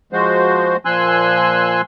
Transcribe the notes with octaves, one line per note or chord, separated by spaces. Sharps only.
F3 G#3 F#4 C5
A#2 F3 G#5 C6 E6 F#6